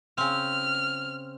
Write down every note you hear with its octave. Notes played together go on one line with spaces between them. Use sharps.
C#3 C4 F6